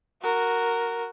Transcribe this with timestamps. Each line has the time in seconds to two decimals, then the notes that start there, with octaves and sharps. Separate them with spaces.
0.22 F#4 A#4